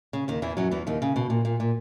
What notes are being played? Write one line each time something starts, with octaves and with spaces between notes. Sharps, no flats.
C#3
D#2 D#3
E2 E3
F#2 F#3
E2 E3
D#2 D#3
C#3
B2
A#2
A#2
A#2